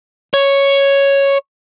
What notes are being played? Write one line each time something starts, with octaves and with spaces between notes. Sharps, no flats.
C#5